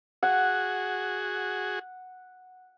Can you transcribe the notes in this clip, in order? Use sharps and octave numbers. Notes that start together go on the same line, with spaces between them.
F#4 G#4 F#5